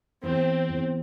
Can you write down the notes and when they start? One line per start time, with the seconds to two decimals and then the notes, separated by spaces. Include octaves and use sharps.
0.22 E2 C4
0.69 E2